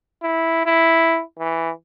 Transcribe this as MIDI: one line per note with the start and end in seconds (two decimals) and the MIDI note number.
0.22 0.61 64
0.66 1.22 64
1.39 1.70 52